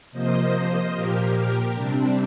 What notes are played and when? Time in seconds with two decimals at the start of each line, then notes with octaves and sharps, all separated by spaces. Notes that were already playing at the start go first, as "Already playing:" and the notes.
0.12 C3 F3 A#3 C5 D#5
0.93 A#2 F3 A#3 G4 A#4
1.74 C3 G3 C4 D4